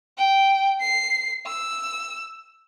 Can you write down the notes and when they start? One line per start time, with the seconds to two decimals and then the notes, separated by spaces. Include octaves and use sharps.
0.18 G5
0.80 C7
1.46 E6